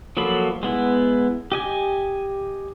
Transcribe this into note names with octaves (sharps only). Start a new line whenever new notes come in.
F3 F#3 A#3 A4 B5
G#3 B3 E4
G4 D#5 G#5